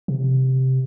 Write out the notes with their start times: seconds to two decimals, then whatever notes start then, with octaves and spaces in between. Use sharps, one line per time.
0.08 C3